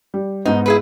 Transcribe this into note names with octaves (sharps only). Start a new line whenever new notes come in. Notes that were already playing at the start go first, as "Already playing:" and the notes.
G3
G#2 B3 D#4
E4 G#4 B4